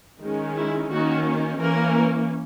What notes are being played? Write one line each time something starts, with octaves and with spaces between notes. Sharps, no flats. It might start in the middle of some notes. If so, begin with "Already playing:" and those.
D#3 G#3 C#4
E4
D#3 A#3 C#4 F#4
E3 A#3 C#4 A#4